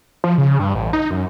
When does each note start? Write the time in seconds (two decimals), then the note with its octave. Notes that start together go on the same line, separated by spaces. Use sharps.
0.24 F3
0.38 C#3
0.59 G2
0.75 A1
0.93 D#4
1.11 F#2